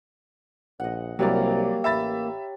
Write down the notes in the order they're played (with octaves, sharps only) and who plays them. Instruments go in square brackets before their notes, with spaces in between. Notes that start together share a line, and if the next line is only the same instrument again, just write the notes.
[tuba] A#1 [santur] D#5 F#5
[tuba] C2 [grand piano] F#3 G3 D5 [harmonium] A#3 [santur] G4 C#5 A#5
[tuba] A1 [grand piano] E5 B5 A6